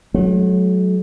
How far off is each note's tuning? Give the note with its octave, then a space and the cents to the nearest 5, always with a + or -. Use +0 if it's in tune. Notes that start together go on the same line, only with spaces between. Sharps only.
F#3 -5 A3 -45